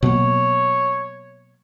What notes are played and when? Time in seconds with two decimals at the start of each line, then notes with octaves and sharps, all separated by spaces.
0.03 B2 F#3 A#3 C#5